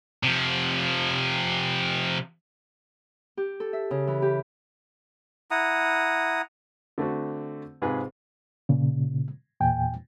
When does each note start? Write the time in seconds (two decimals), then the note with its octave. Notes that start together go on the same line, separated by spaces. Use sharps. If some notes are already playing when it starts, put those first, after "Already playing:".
0.23 C3 F3
3.37 G4
3.60 A4
3.73 E5
3.91 C#3
4.07 E3
4.22 G4
5.51 E4 F#5 A#5 D#6
6.98 D3 A3 C4 F#4
7.82 G#2 C3 F4 G#4 B4
8.69 A#2 C#3
9.61 E2 A#2 G5 G#5